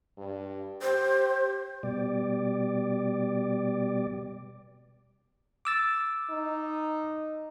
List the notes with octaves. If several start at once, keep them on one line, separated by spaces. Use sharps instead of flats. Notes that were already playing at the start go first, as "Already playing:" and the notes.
G2
G4 C5
B2 G3 D5
D6 E6 A6
D#4